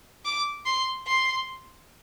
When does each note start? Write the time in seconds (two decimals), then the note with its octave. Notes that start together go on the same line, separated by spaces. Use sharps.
0.25 D6
0.65 C6
1.06 C6